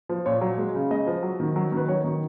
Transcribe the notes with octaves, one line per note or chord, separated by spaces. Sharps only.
F3
A#2 C#5
F#3
G#3
C#3
G#3 D#5
F3
F#3
D#3
F#3
D#3 B4
F#3 C#5
D#3